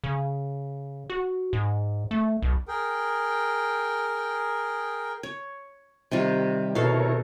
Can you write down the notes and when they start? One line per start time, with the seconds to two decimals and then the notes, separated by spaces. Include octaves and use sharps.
0.04 C#3
1.10 F#4
1.53 G#2
2.11 A3
2.42 B1
2.68 G#4 A#4 G5
5.23 C#5
6.11 C3 D#3 G3 F4
6.75 B2 E4 A4 A#4 C#5 F5